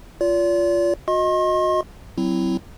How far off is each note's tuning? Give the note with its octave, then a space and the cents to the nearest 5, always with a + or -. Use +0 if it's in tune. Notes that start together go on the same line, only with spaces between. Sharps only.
F4 -5 D5 -40
F#4 -35 D#5 +10 C6 +45
F#3 +25 C4 -5 E4 +10